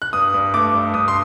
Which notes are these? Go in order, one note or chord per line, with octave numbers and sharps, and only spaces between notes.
F#6
G2 D#6
G2
A3 D6
G2
G2 D#6
C6